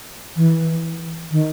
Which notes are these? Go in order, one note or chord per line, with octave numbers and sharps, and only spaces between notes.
E3
D#3